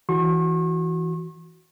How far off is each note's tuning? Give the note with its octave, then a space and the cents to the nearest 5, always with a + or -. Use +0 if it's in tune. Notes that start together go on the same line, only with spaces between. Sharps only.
E3 +0 F#4 +0 C#6 -40